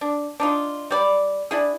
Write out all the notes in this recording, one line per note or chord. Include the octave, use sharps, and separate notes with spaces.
D4
D4 D#4 F4
G3 D5 B5
D4 E4 G#4